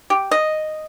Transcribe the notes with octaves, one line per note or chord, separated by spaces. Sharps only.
G4
D#5